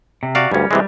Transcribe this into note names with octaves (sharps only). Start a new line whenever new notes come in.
C3
F#4 D5 F5
D2 G2 G3 C#4
C3 E3 G3 G#3